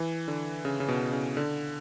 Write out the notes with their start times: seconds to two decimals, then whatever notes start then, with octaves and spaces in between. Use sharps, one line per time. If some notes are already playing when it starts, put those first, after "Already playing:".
Already playing: E3
0.28 D3
0.65 C#3
0.80 C#3
0.88 B2
1.12 C#3
1.37 D3